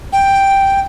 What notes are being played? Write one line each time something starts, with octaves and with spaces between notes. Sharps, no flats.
G5